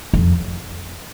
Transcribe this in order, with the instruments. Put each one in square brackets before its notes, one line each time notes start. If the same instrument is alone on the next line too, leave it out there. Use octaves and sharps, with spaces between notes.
[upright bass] F2